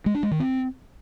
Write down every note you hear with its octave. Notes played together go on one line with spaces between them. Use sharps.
G#3
D4
G#3
D#3
C4